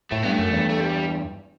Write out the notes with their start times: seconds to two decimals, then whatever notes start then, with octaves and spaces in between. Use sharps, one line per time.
0.12 A2 A3
0.23 G2 B3
0.32 A3
0.39 F#2
0.52 E2 G2
0.70 A3
0.81 G3